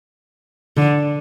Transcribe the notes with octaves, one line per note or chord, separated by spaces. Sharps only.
D3